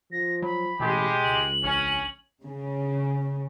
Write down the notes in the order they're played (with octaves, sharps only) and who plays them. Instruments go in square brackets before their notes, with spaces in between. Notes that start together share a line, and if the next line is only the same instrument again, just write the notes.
[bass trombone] F3 [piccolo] A#6
[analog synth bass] F#3 [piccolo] B5
[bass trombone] A1 [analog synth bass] B2 [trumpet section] G#3 G4
[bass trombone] C#2 [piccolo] F#7
[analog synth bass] A#1 [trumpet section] C#4
[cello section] C#3